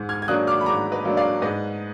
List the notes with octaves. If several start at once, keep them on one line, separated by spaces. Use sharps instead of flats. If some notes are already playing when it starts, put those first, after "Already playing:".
Already playing: G#2
F6 G#6
G#6
F#3 A#3 D4 D#6 F#6
D6 F6
B5
G#2 A#5 D6
B4 D#5
F#3 A#3 D4
D5 F5
G#2 B4 D#5